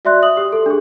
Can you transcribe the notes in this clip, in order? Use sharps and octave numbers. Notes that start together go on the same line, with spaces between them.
F#4 D5 E5 C6 F#6
E5 D#6 F#7
G4
A4
D4 G#4